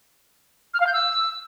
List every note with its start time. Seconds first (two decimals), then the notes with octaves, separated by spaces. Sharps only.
0.74 F6
0.80 F5
0.87 G6
0.93 E6